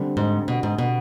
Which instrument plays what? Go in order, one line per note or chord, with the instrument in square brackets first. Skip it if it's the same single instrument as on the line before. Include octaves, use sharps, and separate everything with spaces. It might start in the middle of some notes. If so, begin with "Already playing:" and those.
Already playing: [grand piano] D3 G3 C4
[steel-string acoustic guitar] G#2
B2
G#2
B2